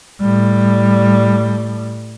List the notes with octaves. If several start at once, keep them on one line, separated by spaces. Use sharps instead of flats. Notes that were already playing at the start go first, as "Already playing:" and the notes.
A2 G3